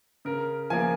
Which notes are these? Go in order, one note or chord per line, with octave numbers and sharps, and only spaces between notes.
C#3 A#4
F3 A#3 G#5